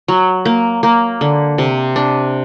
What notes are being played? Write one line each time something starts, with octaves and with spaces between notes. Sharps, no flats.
F#3
A#3
A#3
D3
C3
D4